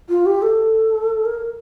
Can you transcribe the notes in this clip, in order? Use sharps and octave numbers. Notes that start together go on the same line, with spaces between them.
F4
G4
A4
A#4